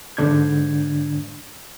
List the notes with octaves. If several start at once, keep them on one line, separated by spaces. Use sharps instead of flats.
G#2 D3 D4 G6 G#6